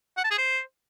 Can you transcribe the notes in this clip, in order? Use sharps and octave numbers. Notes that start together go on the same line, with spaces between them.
F#5
A5
G#4
C5